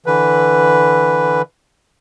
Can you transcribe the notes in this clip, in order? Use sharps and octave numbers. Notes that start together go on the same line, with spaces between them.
D3 E3 B4